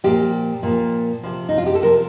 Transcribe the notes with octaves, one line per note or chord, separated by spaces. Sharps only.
A#2 F3 G4
A#2 F3
C3 F3
D#4
F4
G4
A4
C3 F3 A#4